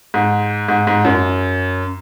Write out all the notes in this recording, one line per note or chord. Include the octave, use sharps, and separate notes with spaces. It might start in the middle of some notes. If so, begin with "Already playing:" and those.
G#2
G#2
G#2
F#2